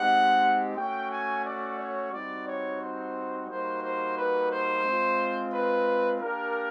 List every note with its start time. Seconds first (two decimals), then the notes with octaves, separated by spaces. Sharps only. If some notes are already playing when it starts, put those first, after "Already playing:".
Already playing: G#3 C4 D#4 G4 F#5
0.76 A3 C#4 F#4 G5
1.10 G#5
1.44 D5
1.78 C#5
2.11 G3 C4 D#4 F#4 D5
2.46 C#5
2.80 C5
3.48 G3 A#3 D#4 F#4 C5
3.82 C5
4.17 B4
4.50 C5
4.85 G#3 C4 F4
5.52 B4
6.20 A#3 D4 G4 A#4